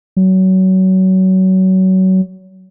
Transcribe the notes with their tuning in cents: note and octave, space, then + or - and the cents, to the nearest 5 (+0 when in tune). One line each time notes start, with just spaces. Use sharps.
F#3 +25